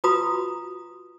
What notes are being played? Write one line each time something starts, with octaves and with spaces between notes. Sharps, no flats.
F4 F#4 B4 A#5 D#6